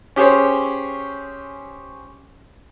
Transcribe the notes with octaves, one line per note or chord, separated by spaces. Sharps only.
C#4 G4 G#4 C5 C#5